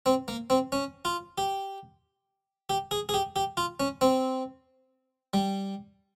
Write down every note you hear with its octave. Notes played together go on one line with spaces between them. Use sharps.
C4
A#3
C4
C#4
F4
G4
G4
G#4
G#4
G4
G4
F4
C#4
C4
G3